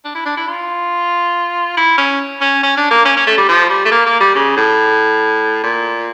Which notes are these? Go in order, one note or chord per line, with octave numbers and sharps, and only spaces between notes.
D4
E4
D4
E4
F4
E4
C#4
C#4
C#4
D4
A#3
C#4
C#4
A3
G3
F3
G3
A3
A#3
A#3
G3
C#3
A2
A#2